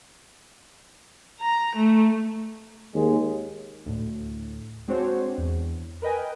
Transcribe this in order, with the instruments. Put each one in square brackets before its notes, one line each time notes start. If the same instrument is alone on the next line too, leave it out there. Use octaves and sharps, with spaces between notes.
[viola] A#5
A3
[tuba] D#2 [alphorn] G#3
[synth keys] D2 A2
G#3 C4 D4 F#4 C5 C#5
E2
A#4 B4 D#5 G5 G#5